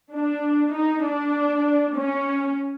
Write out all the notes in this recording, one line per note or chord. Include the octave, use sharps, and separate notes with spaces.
D4
D#4
D4
C#4